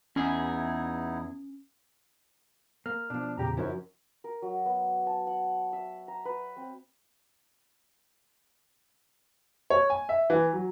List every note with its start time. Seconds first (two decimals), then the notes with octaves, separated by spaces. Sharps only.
0.16 E2 B3 C#4 D#4 E4 G#4
2.86 A#3 F6
3.10 B2 F3 D4
3.38 E2 A#2 C#3 G4 A#5
3.57 F#2 C#3 F3 C#4 D#4 E4
4.24 A#4
4.42 F#3
4.66 B3
5.07 A5
5.27 F#5
5.73 E5
6.08 A#5
6.25 B4
6.57 C4
9.70 C#5
9.90 G#5
10.09 E5
10.30 E3
10.53 F#3